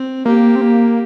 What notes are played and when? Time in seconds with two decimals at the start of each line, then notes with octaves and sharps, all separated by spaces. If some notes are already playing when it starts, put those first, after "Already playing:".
Already playing: C4
0.25 A#3 G4
0.56 C4
0.61 A#3